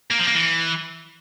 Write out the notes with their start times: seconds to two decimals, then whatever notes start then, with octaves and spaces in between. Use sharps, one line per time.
0.11 A#3
0.19 F3
0.27 A#3
0.35 E3